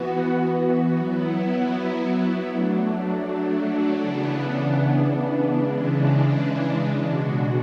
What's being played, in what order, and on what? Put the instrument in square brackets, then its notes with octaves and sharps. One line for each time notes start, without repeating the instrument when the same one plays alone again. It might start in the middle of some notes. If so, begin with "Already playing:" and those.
Already playing: [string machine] E3 B3 F#4
F#3 B3 E4
F#3 A3 D4
C#3 E3 B3 D4
C#3 E3 G#3 D4
B2 G#3 D4 F#4